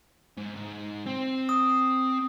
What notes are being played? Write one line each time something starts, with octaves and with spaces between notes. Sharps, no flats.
G#2
G#2
C4
D#6